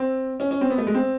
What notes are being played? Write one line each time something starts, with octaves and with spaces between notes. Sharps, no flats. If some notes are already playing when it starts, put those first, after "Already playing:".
Already playing: C4
C#4
C#4
C4
B3
A3
G#3
C4